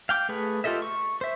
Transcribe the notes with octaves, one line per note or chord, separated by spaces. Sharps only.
F5 G5 D6
A3 G#4 B4
F4 G4 A4 D#5 E5
C#6
C5 E5